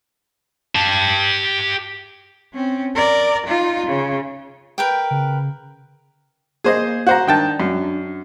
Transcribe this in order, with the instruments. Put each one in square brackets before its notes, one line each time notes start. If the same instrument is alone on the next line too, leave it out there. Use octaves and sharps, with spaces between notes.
[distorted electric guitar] G4 A5
[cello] C4 C#4
A#4 D5
D#4 F4
C#3
[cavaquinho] A#4 B4 G5
[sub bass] C#3
[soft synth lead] A#3 [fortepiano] G#4 C5 D#5
[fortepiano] F#4 C5 A#5 [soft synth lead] G6
[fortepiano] D#3 G5 A5 [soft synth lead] D4
[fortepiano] F#2